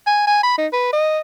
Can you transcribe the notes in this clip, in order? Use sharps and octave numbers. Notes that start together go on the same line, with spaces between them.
G#5
G#5
B5
D#4
B4
D#5